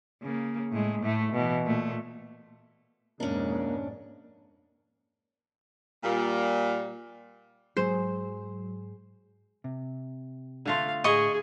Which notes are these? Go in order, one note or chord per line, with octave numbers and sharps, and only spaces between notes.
C#3 A#3
A2 G#3
A2 A3
B2 E3
A#2 A3
F2 G#2 B2 A#3 C#4 D4
A#2 G3
G#2 F#3 G#3 G#4 C5
C3
D3 A3 F4 F5
A2 G#4 D#5 G#5 B5 C#6